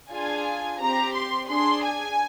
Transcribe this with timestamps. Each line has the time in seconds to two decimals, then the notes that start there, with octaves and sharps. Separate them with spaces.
0.12 D4 F4 G#4 G#5
0.80 C4 G4 A#5
1.15 C6
1.49 D4 G#4 C6
1.84 G#5